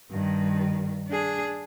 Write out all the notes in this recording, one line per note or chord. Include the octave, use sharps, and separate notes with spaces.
G2 D#3
D4 G#4